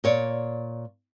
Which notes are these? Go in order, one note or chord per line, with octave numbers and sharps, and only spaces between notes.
A#2 C#5 D5